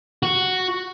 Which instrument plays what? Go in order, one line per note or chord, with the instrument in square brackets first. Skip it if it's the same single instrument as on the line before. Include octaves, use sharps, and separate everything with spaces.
[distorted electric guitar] F#4